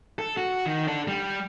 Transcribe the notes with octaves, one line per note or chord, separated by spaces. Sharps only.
A4
F#4
D#3
D4 A4
G3